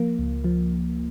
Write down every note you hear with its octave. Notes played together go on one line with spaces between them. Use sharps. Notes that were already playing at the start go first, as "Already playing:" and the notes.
Already playing: F3 A#3
C#2
F3